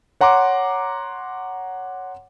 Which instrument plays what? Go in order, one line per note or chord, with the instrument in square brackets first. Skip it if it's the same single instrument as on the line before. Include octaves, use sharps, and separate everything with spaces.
[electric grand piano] C#5 F#5 A#5 C6 D6